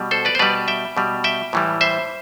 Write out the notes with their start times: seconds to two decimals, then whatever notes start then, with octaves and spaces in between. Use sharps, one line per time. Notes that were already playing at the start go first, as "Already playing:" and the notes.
Already playing: B2 G3
0.11 A4 C5
0.25 B4 D5
0.35 C5
0.39 B2 G3 B4 D5
0.68 E5 G5
0.97 B2 G3
1.24 E5 G5
1.53 A2 E3 G3
1.81 C5 E5